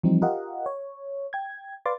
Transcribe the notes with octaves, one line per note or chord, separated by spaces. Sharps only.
E3 F3 G3 C4 D#4
F4 G4 A#4 D#5 F5 F#5
C#5
G5 G#6
B4 D5 F5 C6 D6 A6